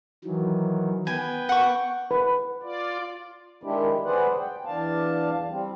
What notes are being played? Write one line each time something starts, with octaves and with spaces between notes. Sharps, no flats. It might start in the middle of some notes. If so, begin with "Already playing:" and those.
D#3 E3 F#3
B3 B4 G5 G#5
F#5 C#6
B4
F4 D5
D#3 G#3 D4 E4 G4
G#4 B4 C5 D5 F#5
G5
E2 D4 F5 A5
G3 C4